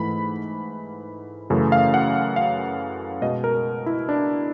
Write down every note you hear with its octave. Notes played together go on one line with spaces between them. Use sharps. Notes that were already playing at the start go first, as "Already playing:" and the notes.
Already playing: G#2 E3 A3 B5
F#2 C#3 E3 A3
F5
F#5
F5
B2 G#3 D#5
A#4
E4
D4